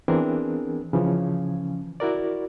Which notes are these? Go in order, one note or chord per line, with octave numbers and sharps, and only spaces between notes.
E3 B3 C4 D4 G#4 A#4
C#3 E3 F3 C#4
E4 F#4 A#4 D5